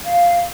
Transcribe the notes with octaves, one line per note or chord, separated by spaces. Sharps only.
F5